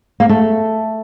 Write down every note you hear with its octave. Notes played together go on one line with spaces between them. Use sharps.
A#3
A3